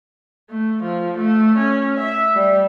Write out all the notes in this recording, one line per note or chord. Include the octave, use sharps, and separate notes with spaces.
A3
F3
A3
C#4
E5
G3